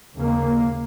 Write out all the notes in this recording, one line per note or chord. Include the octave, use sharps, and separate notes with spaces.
D#2 C#3 A#3